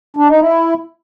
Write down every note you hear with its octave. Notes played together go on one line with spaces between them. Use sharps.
D4
D#4
E4